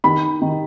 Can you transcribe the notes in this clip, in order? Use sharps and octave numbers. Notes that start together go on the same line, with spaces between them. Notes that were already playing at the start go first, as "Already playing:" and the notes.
D#3 B5
D#3